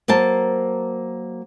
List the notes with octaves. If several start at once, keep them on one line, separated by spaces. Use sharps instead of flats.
F#3 A#3 C5 A5